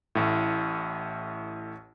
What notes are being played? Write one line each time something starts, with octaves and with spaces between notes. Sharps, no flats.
A1 A2